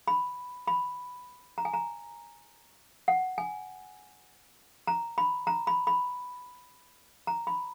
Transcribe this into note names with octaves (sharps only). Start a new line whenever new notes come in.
B5
B5
A#5
G#5
A#5
F#5
G#5
A#5
B5
A#5
B5
B5
A#5
B5